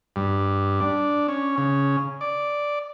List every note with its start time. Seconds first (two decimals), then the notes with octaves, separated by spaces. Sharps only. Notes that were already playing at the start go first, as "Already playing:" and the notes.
0.16 G2
0.80 D4
1.28 C#4
1.58 C#3
2.21 D5